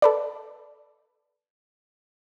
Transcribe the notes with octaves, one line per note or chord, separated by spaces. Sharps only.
A4 B4 D5